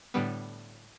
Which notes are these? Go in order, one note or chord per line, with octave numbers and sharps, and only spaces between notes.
A2 D3 G3 B3